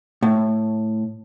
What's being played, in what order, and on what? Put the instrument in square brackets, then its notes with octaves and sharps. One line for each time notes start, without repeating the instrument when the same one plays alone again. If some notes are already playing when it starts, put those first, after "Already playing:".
[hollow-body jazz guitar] A2